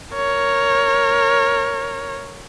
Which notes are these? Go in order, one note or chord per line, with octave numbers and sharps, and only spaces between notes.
A#4 C#5